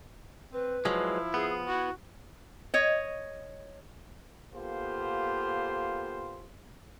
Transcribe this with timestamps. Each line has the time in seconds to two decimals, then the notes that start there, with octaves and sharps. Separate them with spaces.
0.53 C4 B4
0.85 F3 F#3 G#3 E4
1.34 B3 G#4
1.68 E4 F#4
2.74 C#5 D#5
4.54 A#3 B3 F4 G4 A4 C5